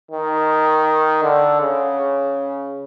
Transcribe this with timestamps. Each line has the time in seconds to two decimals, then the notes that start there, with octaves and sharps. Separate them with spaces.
0.11 D#3
1.23 D3
1.61 C#3